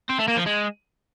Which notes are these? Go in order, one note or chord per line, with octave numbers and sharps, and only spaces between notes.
C4
A3
A#3
F3
G#3